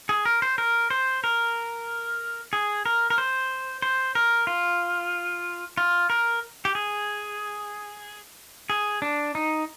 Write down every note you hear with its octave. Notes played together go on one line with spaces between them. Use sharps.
G#4
A#4
C5
A#4
C5
A#4
G#4
A#4
A#4
C5
C5
A#4
F4
F4
A#4
G4
G#4
G#4
D4
D#4